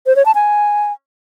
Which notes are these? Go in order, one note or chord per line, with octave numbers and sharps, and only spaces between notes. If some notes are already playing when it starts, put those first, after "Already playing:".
C5
C#5
A5
G#5